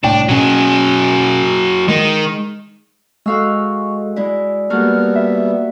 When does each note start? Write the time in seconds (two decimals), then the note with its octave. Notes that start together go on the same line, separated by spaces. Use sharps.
0.04 C2 A2 D4 G5
0.29 B2 F#3 C#4 G#4
1.88 D#3 G#3
3.26 G#3 F#4 A4 F5 C#6 E6
4.16 G#3 E4 D5
4.70 G3 A#3 B3 F#4 A4 F6
5.16 E5